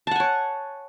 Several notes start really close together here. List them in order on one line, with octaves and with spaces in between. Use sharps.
A5 F#5 G#5 C#5